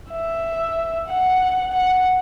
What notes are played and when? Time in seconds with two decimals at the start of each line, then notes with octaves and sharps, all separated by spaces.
0.11 E5
1.07 F#5
1.72 F#5